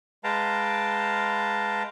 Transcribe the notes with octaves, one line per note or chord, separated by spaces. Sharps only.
G#3 B4 F5 G5 A5 A#5